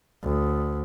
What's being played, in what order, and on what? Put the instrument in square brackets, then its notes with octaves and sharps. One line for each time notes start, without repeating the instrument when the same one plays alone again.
[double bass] D2